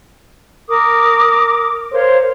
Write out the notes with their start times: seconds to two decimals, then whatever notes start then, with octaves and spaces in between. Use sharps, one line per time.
0.69 A#4 D6 D#6
1.93 A#4 C5 C#5 F5